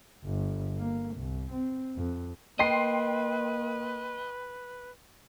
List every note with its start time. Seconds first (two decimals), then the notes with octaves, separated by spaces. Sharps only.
0.24 G1
0.78 A#3
1.15 C2
1.51 C4
1.96 F2
2.59 A#3 B4 D#5 G5 C6 C7